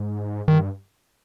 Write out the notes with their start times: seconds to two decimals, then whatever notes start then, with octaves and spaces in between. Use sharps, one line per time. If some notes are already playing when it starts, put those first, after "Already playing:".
Already playing: G#2
0.48 G2 D#3